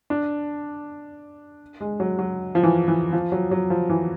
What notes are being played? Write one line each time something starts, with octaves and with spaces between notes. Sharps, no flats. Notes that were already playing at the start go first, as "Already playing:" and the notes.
D4
G#3
F#3
F#3
F3
E3
E3
F3
F#3
F#3
F3
E3